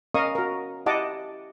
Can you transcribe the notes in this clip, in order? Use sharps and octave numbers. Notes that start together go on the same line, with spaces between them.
C#4 A#4 D#5 F5 C#6 D#6
F#4 A#4
E4 G4 D#5 F#5 A5 D6